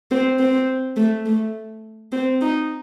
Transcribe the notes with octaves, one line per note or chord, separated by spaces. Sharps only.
C4
C4
A3
A3
C4
D#4